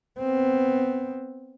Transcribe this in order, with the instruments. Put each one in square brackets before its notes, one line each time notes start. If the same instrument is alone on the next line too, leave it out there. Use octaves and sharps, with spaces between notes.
[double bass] B3 C4